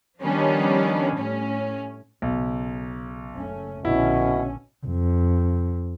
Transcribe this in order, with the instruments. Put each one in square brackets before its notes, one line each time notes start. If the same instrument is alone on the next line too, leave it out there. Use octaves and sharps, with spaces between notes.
[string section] D#3 F3 G3 B3 C#4 D4
A2 C#4
[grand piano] B1 [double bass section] C#3
[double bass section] F#1 A3 C#4
[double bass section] A#1 D3 C#4 [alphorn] B2 [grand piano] E4
[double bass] F2